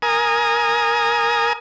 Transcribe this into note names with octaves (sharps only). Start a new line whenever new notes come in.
A#4 G#5 D#6